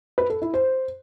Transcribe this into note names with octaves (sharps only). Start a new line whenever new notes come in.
B4
A4
E4
C5